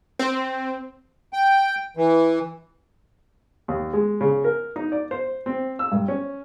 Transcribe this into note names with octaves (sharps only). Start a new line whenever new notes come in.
C4
G5
E3
D#2
G#3
C#3
A#4
D#4
D5
C5
C4
E6
G2
C#4